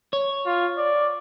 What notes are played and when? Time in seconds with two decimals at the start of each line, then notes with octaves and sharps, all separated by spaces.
0.13 C#5
0.46 F4
0.77 D5